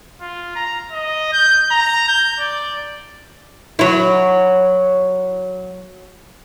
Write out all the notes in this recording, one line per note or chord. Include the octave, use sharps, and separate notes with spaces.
F4
A#5
D#5
G6
A#5
G6
D5
F#3 E4